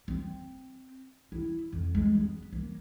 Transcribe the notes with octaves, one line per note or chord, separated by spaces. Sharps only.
C4
E4
F2
G#3
B3
A#3